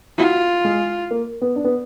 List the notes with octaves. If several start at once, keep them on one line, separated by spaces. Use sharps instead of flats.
F4 F#4
G#3
A#3
B3
D4
B3